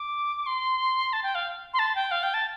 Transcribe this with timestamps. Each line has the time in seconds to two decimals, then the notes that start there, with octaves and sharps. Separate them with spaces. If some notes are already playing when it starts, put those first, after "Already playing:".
Already playing: D6
0.46 C6
1.13 A5
1.23 G5
1.35 F5
1.74 C6
1.79 A5
1.95 G5
2.11 F5
2.23 G5
2.34 A5